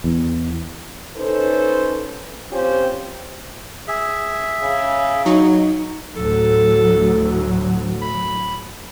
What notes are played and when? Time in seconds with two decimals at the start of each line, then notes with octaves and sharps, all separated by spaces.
0.04 E2
1.17 C#4 D#4 A4 B4 C5
2.51 C4 C#4 F4 G4 C5
3.88 G#4 E5
4.62 C#3
5.26 F#3 D#4
6.16 D2 A2 F#3 A4
8.02 B5